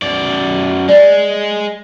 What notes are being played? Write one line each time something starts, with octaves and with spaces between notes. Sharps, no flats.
F#2 D5
G#3 D5